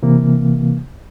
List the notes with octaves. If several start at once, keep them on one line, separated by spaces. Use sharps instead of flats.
C3 E3 A#3